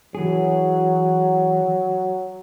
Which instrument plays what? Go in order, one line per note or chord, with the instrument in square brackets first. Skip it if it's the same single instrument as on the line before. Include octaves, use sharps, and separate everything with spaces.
[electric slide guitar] E3 G#4 [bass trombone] F#3